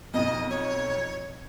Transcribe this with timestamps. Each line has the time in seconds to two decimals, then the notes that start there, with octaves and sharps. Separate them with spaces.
0.14 B1 F2 D#5
0.50 C#5